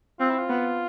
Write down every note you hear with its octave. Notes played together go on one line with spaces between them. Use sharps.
C4 F4
E4
F4
B3